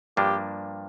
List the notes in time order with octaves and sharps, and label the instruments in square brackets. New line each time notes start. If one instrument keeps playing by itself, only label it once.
[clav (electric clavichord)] G2 F3 A#3 D4 [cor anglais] G4